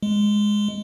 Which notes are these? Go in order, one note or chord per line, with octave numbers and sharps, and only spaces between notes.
G#3